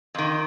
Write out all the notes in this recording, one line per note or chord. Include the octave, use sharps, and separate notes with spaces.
F2 D#3